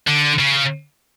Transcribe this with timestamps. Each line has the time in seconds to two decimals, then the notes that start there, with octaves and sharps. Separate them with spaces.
0.07 D3
0.39 C#3